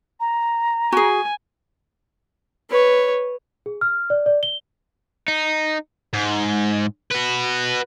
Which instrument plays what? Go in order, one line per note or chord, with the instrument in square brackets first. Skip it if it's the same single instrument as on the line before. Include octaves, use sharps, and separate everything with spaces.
[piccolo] A#5
[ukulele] F#4 G#4 [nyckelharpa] G#5
[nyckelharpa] B4 C#5
[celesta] G#4
F6
D5
D5
G7
[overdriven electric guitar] D#4
[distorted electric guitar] G#2
F#4 B4